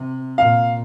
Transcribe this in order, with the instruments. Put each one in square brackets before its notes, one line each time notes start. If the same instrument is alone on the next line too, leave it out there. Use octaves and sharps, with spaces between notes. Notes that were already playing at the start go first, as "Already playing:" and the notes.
Already playing: [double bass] C3
[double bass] A#2 [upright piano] F5